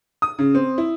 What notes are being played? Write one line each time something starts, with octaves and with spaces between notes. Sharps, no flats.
D#6
C#3
C4
E4